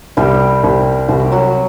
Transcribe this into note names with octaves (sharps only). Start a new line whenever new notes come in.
C2 G3 G4
C2
C2 F#4
G4
F#3 F#4